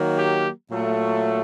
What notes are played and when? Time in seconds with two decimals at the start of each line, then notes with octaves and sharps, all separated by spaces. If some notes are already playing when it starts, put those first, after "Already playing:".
Already playing: D#3 F#3 A#3
0.17 G4
0.71 A#2 F#3 A3